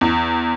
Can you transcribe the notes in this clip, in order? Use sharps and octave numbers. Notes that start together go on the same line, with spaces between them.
E2